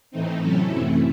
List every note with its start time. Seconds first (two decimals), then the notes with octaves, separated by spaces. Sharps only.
0.11 A2 E3 A3 C4 D#4
0.39 C3 F#3 C#4 E4 A4
0.67 F#2 E3 A3 C4